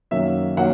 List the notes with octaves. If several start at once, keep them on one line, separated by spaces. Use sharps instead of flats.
F#2 D#3 F#3 A#3 E5
D#3 F#3 A#3 F#5